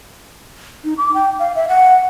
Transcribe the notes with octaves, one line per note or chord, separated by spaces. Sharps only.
D#4
D6
G5
F5
E5
F#5